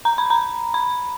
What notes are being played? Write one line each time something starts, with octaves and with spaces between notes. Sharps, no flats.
A#5
B5
A#5
B5